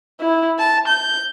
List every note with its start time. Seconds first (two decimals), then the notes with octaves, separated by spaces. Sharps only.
0.20 E4
0.59 A5
0.88 G6